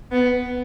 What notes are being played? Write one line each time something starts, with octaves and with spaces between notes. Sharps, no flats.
B3